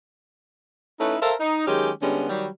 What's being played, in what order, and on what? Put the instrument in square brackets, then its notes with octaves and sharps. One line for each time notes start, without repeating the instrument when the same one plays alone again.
[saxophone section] A3 C#4 D#4 E4 B4
A4 A#4 C5 E5 F5
D#4
D#3 F#3 G#3 C#4 G4
D3 G3 G#3 B3 C#4
D#3 F#3 G3